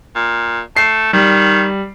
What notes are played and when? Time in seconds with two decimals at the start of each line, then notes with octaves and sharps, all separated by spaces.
0.15 A#2
0.76 A3 C7
1.13 D#3 G3